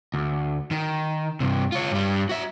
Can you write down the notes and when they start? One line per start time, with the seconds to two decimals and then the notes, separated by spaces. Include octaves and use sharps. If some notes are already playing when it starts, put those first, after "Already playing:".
0.14 D2
0.71 D#3
1.40 G2 C3
1.72 F4 C#5
1.91 G2 G3
2.29 F#4 E5